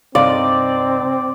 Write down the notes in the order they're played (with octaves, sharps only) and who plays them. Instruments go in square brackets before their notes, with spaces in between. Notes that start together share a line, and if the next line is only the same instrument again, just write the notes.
[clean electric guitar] C2 G2 D#4 [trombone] C4 [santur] D5 [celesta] F5 C6